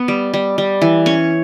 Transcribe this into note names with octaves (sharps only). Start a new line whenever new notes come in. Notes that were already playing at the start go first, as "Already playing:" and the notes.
Already playing: B3 B4
G3
G3
G3
E3
C#4 C#5